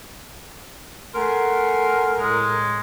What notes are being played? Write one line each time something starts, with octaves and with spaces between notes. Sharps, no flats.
A3 A#4 F#5 G#5 C6
A2 G#3